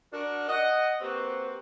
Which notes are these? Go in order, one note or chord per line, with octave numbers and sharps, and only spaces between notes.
D4 F#4 A#4
D#5 F#5
A#3 C4 F#4 G4 B4 C5